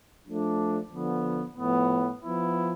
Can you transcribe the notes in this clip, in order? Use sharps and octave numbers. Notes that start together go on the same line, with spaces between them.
F3 A3 D4
D3 F3 B3
A2 F3 B3
F3 B3 E4